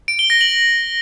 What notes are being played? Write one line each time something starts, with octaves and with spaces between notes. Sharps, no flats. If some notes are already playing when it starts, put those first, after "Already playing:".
D7
G7
A#6
F#7